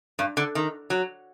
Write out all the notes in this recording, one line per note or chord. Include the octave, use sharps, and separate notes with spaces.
G2
D3
D#3
F#3